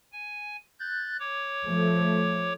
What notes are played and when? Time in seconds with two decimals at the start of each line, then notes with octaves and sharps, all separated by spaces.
0.13 G#5
0.80 F#6 G6 A6
1.20 C#5 D6
1.63 F3 A3